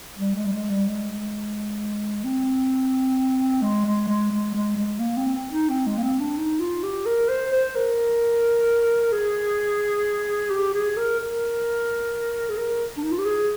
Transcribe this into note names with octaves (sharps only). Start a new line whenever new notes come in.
G3
G#3
G3
G#3
G3
G#3
C4
G#3
G#3
G#3
G#3
G#3
G#3
A#3
C4
D#4
C4
G#3
A#3
C4
D4
D#4
F4
G4
A#4
C5
C5
A#4
G#4
G4
G#4
A#4
A#4
G#4
A#4
D4
D#4
F4
G4
G#4